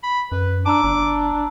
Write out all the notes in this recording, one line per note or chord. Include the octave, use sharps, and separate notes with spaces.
B5
F#2 B4
D4 A5 A#5 D6 E6
G1 D4